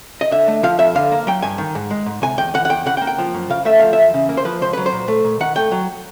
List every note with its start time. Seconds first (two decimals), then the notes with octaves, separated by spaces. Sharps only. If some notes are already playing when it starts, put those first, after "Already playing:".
0.21 D#5
0.31 D3 E5
0.48 A3
0.63 F3 F5
0.79 F2 E5
0.95 D3 F5
1.11 A#3
1.27 F#3 G5
1.42 G2 G#5
1.58 D#3
1.75 G#2
1.91 G#3
2.06 G#2
2.22 C3 G#5
2.38 E2 G5
2.54 E3 F#5
2.65 F#5
2.69 E2 G5
2.86 C#3 F#5
2.97 G5
3.01 A#3
3.07 G5
3.18 F3
3.34 F#2
3.50 C#3 F5
3.65 A3 E5
3.79 F3 F5
3.93 E2 E5
4.14 C#3
4.29 A#3
4.37 C5
4.45 F3 B4
4.61 C#2 C5
4.73 F#3 B4
4.86 C5
4.92 A#2
5.08 A3
5.24 A#2
5.40 D#3 F#5
5.56 A3 G5
5.72 F#3